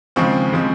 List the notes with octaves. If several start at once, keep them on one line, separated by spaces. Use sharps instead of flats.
D#2 C#3 F3 G#3 C4 C#6
C#3 F3 G#3 C4